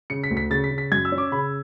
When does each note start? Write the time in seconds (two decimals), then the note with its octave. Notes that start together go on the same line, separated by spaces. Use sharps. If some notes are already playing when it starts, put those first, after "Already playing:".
0.10 C#3 C#7
0.24 B6
0.30 D2
0.37 B6
0.50 C#3 A6
0.64 B6
0.71 C#3
0.78 B6
0.92 F#2 G#6
1.05 E6
1.12 C#4
1.18 D6
1.32 C#3 B5